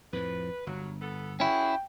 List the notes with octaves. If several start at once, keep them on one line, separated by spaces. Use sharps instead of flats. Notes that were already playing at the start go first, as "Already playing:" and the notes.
F2 A2 F3 B4
G1 F#3
B3 A4
E3 C#4 E4 F#4 G#4 G5